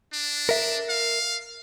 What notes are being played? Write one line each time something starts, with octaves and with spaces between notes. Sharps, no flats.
D4
A#4 E5
F5